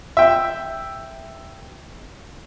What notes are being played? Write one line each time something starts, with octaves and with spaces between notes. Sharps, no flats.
E5 G5